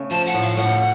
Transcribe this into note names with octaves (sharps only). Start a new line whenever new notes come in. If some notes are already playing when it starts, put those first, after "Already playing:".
Already playing: C#3 A3
F3 A5
F#5
A2
F5
A2 F#5